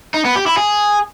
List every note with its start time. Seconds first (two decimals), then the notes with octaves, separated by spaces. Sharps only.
0.14 D#4
0.25 B3
0.36 G4
0.46 E4
0.57 G#4